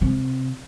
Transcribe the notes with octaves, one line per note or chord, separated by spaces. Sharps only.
C3